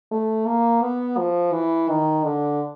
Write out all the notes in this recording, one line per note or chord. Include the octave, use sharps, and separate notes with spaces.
A3
A#3
B3
F3
E3
D#3
D3